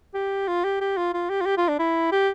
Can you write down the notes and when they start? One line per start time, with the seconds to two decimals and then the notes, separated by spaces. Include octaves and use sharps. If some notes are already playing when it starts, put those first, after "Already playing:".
0.14 G4
0.48 F4
0.64 G4
0.81 G4
0.97 F4
1.14 F4
1.29 G4
1.41 F4
1.46 G4
1.57 F4
1.68 D4
1.79 E4
2.12 G4